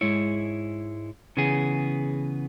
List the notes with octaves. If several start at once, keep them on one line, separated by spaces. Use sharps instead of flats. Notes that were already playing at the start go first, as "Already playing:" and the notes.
G#2 G#3 E4 C#5
C#3 E3 B3 G#4